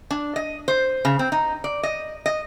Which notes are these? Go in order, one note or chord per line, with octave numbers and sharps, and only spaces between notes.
D4
D#5
C5
C#3
C4
D#4
D5
D#5
D#5